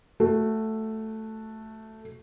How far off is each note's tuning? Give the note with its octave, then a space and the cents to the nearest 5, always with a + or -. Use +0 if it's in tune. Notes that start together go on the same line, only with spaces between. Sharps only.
A3 +0 F#4 +0